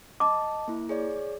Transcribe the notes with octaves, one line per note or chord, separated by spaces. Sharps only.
D#5 A5 D6
A#3 E4
G#4 C#5 D5